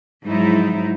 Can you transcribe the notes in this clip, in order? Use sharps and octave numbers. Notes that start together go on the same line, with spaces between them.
G#2 F3 F#3 D#4 E4